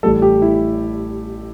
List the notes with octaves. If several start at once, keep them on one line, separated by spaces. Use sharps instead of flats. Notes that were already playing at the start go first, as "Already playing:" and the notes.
A1 A2 G3 A4
G4
E4